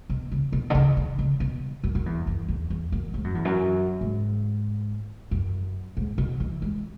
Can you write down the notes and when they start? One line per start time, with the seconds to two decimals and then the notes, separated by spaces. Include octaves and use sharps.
0.09 B2
0.32 C#3
0.52 B2
0.70 D3
0.75 C#3
0.97 D3
1.19 C#3
1.40 B2
1.84 F#2
1.95 F#2
2.06 E2
2.27 F#2
2.48 E2
2.70 E2
2.92 F#2
3.14 G#2
3.24 F#2
3.35 E2
3.45 F#2
4.01 G#2
5.31 F#2
5.97 G#2
6.18 B2
6.40 E3
6.62 G#3